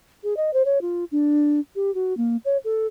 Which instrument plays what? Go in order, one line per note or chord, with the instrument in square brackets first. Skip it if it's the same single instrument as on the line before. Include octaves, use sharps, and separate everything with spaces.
[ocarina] G#4
D#5
C5
C#5
F4
D4
G4
F#4
A#3
C#5
A4